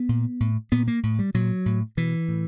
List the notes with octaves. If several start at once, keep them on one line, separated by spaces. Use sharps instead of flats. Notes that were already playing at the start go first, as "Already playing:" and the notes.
Already playing: B3
A#2
A2
A#2 B3
A#3
A2
G3
A#2 F#3
A2
B2 E3
A2